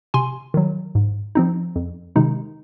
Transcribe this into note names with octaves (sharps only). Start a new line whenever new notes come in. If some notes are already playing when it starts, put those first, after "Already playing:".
C3 G#5 C6
D#3 F#3
G#2
F3 C4 D#4
F2
C3 D#3 G#3 D#4